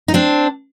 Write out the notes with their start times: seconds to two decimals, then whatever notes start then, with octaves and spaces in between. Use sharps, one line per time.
0.08 D#4
0.14 C4 D4